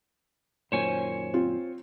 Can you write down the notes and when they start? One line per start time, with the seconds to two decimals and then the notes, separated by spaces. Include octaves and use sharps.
0.72 F#2 A#2 D#3 C5 C#5 G#5
1.34 C4 F4